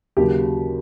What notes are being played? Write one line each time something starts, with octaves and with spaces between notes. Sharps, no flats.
D#2 C#3 F#3 G4